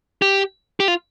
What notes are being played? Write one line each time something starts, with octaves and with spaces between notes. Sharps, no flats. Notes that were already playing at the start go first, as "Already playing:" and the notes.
G4
G4
F4